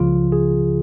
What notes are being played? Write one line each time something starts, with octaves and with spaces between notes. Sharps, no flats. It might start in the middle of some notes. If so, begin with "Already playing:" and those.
Already playing: C#2 C#3 F3 F4
G#4